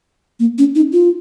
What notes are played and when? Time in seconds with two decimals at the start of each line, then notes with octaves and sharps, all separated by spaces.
0.40 A#3
0.58 C#4
0.75 D#4
0.93 F4